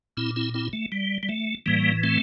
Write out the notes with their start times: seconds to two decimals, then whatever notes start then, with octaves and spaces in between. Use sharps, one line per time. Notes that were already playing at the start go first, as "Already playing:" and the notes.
0.17 A#2 C4 E4
0.36 C4 E4
0.54 C4 E4
0.73 A3
0.92 G3
1.23 G3
1.29 A3
1.66 A2 E3 G3 A#3
2.03 A3 C4